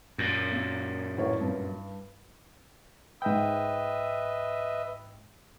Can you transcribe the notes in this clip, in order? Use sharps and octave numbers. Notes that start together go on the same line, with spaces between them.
F#2 A#2
A#3
A1 A#4 C#5
G2
G#2 B4 D#5 E5 G5